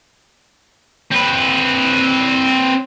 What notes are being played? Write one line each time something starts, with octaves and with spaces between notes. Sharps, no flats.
C4 B4